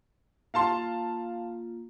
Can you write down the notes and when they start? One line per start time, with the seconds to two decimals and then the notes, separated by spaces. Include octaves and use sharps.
0.54 A#3 F4 F5 A5 C6